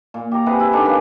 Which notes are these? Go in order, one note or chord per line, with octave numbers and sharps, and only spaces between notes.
A#2
G4 A#5
C3 G#4 B4 F#5
E4 G#5
D3 D#3 D4
C#3 G3 A#3 B4